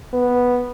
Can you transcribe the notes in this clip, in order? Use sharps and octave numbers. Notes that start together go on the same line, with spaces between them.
B3